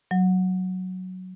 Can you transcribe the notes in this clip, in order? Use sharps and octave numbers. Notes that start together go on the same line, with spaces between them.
F#3